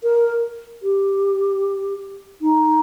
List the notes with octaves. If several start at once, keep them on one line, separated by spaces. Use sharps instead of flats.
A#4
G4
D#4